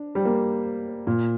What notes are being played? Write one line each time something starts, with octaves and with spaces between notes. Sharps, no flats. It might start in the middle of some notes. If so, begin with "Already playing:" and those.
Already playing: D4
G3
A#3
A#2